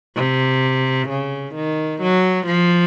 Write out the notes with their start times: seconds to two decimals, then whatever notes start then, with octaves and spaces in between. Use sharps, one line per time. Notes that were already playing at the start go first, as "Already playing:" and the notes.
0.16 C3
1.09 C#3
1.55 D#3
2.02 F#3
2.47 F3